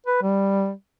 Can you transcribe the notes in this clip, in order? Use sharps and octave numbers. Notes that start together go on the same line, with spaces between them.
B4
G3